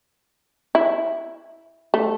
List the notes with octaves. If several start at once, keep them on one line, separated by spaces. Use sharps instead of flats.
E4
A3